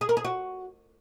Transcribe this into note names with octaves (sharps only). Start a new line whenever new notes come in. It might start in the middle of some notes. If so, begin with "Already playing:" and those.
G#4
A#4
G#4
F#4